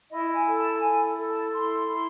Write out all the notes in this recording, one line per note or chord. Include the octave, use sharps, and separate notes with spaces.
E4 D#5
G#5
A4
A5
E4 G#5
A4
A5
E4 C6
E4